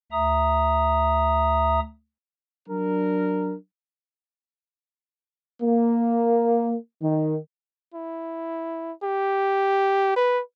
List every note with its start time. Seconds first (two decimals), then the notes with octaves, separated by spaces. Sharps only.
0.12 D2 E5 A#5 D#6
2.68 F#3 D4 A#4
5.62 A#3
7.02 D#3
7.94 E4
9.03 G4
10.16 B4